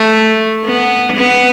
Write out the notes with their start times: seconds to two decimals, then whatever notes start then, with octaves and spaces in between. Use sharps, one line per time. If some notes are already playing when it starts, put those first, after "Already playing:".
Already playing: A3
0.65 B3
1.16 B3